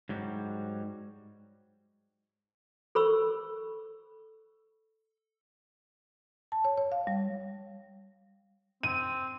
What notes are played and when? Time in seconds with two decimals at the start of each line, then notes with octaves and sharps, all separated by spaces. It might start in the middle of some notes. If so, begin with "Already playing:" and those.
0.09 G#2 F#3 G3
2.95 A4 C5 B5 C#6 E6
6.52 A5
6.65 C#5
6.78 C#5
6.92 F5
7.07 G3
8.83 C4 D#7